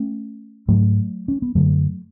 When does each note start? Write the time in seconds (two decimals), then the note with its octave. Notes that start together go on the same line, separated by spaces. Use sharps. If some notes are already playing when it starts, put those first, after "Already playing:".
Already playing: A3 C#4
0.68 G#2 F#3 A3
1.28 C#4
1.42 B3
1.55 F#2 D3 F#3 A3